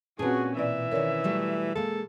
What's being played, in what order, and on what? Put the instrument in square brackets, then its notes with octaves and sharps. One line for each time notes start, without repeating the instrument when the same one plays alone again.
[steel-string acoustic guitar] A#2 A#3 [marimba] C4 B4 A5 [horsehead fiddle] C#4 F#4 [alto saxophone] G#4
[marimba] B2 D5 [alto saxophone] E3 [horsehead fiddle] E5
[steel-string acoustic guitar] D#3 C#4 [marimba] A#4 C#5 D5
[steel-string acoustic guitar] F#3 G3 A3
[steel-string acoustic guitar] G#3 A#3 [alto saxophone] A4